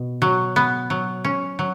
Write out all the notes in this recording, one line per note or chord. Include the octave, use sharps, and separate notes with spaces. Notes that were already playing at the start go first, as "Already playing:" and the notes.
Already playing: B2
F#3
B3
F#3
C#4
F#3